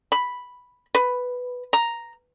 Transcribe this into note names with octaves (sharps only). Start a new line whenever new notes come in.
B5
B4
A#5